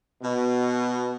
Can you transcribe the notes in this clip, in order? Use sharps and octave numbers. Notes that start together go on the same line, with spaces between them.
B2